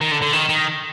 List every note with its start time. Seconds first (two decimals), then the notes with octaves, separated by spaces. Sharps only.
0.01 D#3
0.11 D3
0.22 D3
0.33 D#3
0.49 D#3